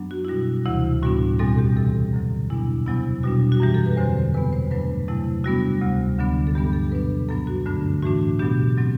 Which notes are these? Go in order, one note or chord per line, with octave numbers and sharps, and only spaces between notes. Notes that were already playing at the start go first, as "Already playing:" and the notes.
Already playing: F#2 F#3 B3 D4
F#4
E4
B2 G3 D4 F#4
D2 C3 E3 E4
A2 G3 B3 D4 F#4
E2 B2 G3 C4 A4
G4
C3 E3 G3 A4
F#2 D3 F#3
E2 B2 G3 B3 D4 E4
E2 C3 F#3 B3 E4
B2 G3 D4 F#4
F#4
F#2 E3 G3 G4
A4
B4
E2 D3 F#3 C4 C5
E2 C3 G3 B3 B4
C5
G2 F#3 A3 D4 B4
E2 C3 F#3 A3 E4
C3 G3 B3 D4 F#4
D2 C3 G3
D2 D3 F#3 B3 D4
A4
G2 E3 G3 B3 D4 G4
A4
B2 F#3 B3 D4 B4
F#2 F#3 B3 D4 A4
F#4
G2 D3 A3 D4
A2 E3 A3 D4 F#4
B2 F#3 B3 D4 G4
F#3 C4